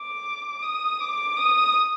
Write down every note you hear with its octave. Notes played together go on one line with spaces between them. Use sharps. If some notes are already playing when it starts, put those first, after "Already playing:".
Already playing: D6
D#6
D6
D#6